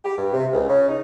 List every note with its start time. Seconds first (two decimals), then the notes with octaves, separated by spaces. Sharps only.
0.05 G4
0.17 G2
0.33 C3
0.53 C#2
0.69 C#3
0.88 D#4